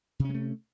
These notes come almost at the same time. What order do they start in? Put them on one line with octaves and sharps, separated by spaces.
C3 C#4 G#3 A3